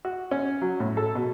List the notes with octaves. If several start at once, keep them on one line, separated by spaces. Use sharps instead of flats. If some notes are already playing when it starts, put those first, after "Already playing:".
F#4
C#4
F#3
A2
A4
B2